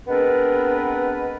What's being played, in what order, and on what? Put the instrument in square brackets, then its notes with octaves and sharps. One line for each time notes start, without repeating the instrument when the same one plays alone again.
[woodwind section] G#3 B3 C4 D4 A#4 B4